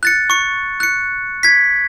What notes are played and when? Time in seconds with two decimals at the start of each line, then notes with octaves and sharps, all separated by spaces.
0.03 F#6 A6 C#7
0.30 C#6 C#7
0.80 F#6 C#7
1.43 G#6 B6